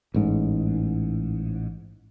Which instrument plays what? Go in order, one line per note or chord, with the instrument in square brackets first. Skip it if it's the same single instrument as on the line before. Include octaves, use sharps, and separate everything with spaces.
[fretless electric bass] A1 G#2